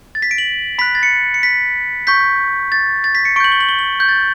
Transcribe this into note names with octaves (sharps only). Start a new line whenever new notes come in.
A6
B6
D7
F#7
B5 F#6 B6
A6
C#7
C#7
B6
C#6 G6 B6
A6
A6
B6
C#7
C#6 G6 D7 F#7
G7
F#7
G7
F#7
G6
A6